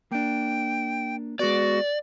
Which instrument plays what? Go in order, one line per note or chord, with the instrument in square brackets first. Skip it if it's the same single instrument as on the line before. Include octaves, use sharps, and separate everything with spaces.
[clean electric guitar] A#3 D4 [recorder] G5
[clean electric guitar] G#3 B3 [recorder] F#4 [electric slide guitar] D5